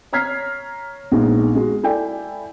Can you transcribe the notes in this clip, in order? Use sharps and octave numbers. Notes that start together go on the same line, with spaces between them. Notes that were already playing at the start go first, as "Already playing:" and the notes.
C#5 A#5 F6 G#6 B6 C7
A#1 G#3 B3 D#4
G#3 F#4
E4 A4 D5 E5 G5 G#5